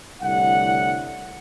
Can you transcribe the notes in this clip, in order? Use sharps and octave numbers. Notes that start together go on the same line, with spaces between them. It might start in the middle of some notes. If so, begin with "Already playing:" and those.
C2 A2 D3 G3 F#5